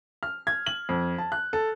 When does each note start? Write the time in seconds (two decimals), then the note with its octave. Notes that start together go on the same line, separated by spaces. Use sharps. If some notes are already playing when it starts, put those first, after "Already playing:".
0.23 F6
0.47 G#6
0.66 F#7
0.89 F2
1.18 A5
1.32 F#6
1.53 A4